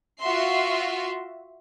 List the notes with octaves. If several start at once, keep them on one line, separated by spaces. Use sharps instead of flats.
F4 F#4 E5 C6